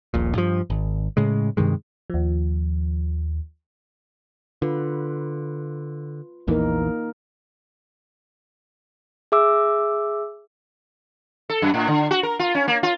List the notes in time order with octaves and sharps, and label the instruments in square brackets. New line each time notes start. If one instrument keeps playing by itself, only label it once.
[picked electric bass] D#1 A#1 A#2
G2 F3
G#1
A2 C#3 G#3
G2 C3 D#3 G#3
[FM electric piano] D#2 F3
[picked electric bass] D3 [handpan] F4 B4
[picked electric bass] A#1 E2 E3 [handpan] A#3 D#4 A#4
[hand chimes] G#4 E5 D6 E6
[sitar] A4
F#2
A2
D3
F#4
A#4
F4
C#4
A#3
F4